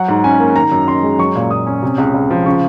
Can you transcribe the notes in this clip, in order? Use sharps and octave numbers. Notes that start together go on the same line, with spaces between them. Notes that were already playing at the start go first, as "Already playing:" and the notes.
Already playing: F#3 F#5
G#2
C#4 G#5
A#3
D#3 A#5
F#2
F#2 C6
G#3
F#3 C#6
A#2
A#2 D#6
C#4
C3
C#2
C#2
F3
C#3 C#6